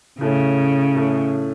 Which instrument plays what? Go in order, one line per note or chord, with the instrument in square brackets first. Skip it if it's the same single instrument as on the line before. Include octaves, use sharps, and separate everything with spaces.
[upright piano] A2 A3 C#4 [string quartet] C#3
[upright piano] A2 A3 C#4